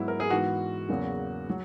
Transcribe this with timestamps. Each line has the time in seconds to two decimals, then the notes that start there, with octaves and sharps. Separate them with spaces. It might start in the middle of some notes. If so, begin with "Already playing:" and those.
Already playing: G#2 F#3 B3 E4
0.08 A#4
0.20 G#4
0.30 G#2 E3 B3 F#4
0.89 E2 C#3 F#3 A#3
1.50 F#3